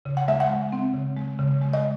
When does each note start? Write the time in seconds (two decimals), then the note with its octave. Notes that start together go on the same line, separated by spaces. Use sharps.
0.05 C#3
0.17 F#5
0.28 G#3 E5
0.40 F#5
0.50 G#3
0.72 C4
0.94 C#3
1.17 G#3
1.39 C#3
1.61 G#3
1.73 D#5